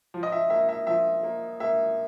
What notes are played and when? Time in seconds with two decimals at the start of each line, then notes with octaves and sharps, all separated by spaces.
0.14 F3
0.23 D#5
0.32 E5
0.50 A#3 E5
0.69 E5
0.87 F3 E5
1.23 A#3
1.60 A#3 E5